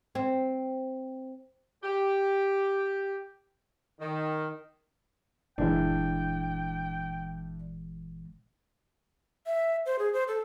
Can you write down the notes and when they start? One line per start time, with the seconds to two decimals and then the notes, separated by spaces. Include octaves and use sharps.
0.15 C4
1.83 G4
4.00 D#3
5.58 F#1 A#2 E3 G#3 D4 E4 G5
9.46 E5
9.86 C5
9.99 G#4
10.13 C5
10.28 A4